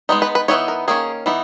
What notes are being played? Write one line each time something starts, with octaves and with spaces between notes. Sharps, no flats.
G#3 B3 D#4
B4
B4
E3 B3 D#4 C#5
A#4
D#3 A#3 C#4 G#4
E3 B3 D#4